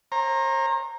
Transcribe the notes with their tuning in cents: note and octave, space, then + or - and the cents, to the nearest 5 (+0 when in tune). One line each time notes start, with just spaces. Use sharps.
C5 +45 A#5 +0